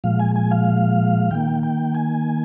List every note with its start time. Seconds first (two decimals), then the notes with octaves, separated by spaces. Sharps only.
0.04 A#2 F3 G#3 F5
0.19 G#5
0.36 G#5
0.51 F5
1.30 D#3 A#3 G5
1.63 G5
1.95 G#5